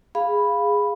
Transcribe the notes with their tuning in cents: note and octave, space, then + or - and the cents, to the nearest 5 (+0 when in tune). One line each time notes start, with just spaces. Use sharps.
G#4 -10 F5 +0 B5 +0